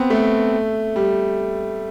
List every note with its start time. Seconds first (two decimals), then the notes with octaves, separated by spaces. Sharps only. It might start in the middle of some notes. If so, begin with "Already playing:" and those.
Already playing: B3 C4
0.10 A3
0.96 G3